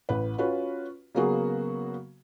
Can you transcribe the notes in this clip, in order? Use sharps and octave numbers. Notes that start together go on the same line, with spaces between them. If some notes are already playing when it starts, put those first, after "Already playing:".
A1 B4
C#4 F4 F#4 B4
C#3 F#3 A#3 B3 F#4 G#4